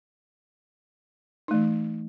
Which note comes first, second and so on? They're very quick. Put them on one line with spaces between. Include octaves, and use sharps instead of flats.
D#4 A3 E3